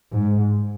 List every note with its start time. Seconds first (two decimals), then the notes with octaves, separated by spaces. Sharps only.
0.13 G#2